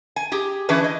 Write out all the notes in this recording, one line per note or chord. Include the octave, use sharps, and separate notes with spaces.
G#5
G4 G#4
E3 C#4 D4 G#4 B4
D#5